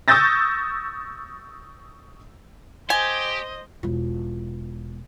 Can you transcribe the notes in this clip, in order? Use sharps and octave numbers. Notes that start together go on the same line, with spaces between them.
C#6 D#6 E6 G6 A6 A#6
G4 C5 D#5 G#5
E1 F4